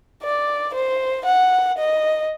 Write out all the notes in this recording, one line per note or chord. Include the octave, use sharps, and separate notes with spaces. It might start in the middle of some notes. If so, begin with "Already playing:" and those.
D5
C5
F#5
D#5